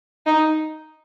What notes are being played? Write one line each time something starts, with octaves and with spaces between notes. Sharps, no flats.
D#4